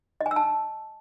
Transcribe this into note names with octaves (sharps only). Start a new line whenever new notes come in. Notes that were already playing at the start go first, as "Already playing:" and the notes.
D#5
G#5
E6
A5